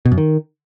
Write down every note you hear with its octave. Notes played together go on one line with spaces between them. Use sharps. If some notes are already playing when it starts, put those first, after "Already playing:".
B2
F#2
D#3